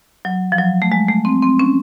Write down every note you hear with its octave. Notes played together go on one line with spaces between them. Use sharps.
F#3
F3
F#3
A3
G#3
A3
C4
C4
C#4